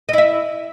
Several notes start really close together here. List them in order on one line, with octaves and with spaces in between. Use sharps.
D#5 E4 E5